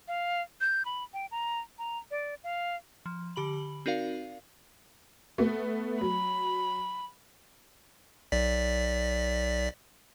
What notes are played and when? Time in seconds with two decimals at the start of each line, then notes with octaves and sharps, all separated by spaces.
0.08 F5
0.61 G6
0.85 B5
1.14 G5
1.31 A#5
1.79 A#5
2.11 D5
2.44 F5
3.06 F3
3.36 D3 G4 B5 F#7
3.86 C4 D#4 F#4 A#4 D5 F5
5.38 A3 B3
6.01 F#3 B5
8.32 B1 D5 B6